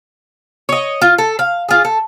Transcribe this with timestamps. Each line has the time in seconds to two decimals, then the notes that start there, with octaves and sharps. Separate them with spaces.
0.69 C#5 D#5
1.02 F4
1.18 A4
1.39 F5
1.69 F4 G#4
1.85 A4